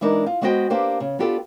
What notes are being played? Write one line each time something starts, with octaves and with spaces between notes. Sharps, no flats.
E3 G#3 D4 D#4 A#4
F4
G#3 B3 F#4 C5 D#5 G5
A#3 D4 G4 B4 C5
C#3
B3 D4 F4 G4 A4 B4